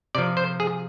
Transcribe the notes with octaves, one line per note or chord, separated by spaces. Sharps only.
C3 F3 D5
C5
G#4